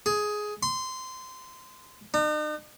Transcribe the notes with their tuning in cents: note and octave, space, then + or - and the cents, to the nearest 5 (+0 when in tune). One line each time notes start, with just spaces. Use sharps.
G#4 +10
C6 -20
D#4 -45